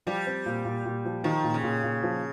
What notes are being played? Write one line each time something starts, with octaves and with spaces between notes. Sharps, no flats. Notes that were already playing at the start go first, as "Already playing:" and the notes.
F3 G3
C4
A#2
A#2
A#2
F3
D#3 F3
A#2
C#3
A#2
A#2
F3